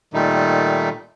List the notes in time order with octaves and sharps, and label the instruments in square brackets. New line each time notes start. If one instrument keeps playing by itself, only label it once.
[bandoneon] A#2 D#3 G3 A3 D#4